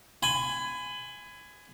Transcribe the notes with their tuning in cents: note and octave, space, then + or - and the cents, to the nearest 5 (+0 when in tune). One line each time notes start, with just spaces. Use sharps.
G#5 +0 B5 +30